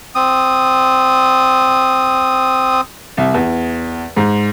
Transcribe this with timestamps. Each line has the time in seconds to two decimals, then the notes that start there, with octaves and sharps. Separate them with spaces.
0.15 C4 D#6
3.17 C2
3.34 E2
4.16 G#2